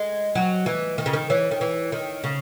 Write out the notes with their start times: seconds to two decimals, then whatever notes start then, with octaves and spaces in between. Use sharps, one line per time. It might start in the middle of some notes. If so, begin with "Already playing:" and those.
Already playing: G#3 D#5
0.35 F#3
0.66 E3
0.98 D#3
1.06 C#3
1.13 D#3
1.30 E3 C#5
1.51 D#3
1.61 E3
1.92 D#3
2.24 C#3